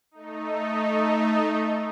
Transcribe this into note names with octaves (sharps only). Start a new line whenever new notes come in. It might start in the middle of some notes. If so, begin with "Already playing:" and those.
A3 D#4